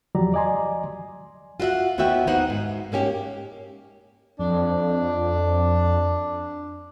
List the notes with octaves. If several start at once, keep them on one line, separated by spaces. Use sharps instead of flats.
E2 F3 F#3 G4 D5 A#5
D5 D#5 G#5 A#5 C6
F4 F#4 C5 E5 F#5
D#2 B3 E4 F#4 E5 G5
A#3 B3 D#4 F#4 C5 F#5
G#2
G#2 A#3 C#4 G4
F2 D4